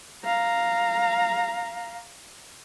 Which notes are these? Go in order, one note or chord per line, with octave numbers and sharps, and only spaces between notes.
F5 A#5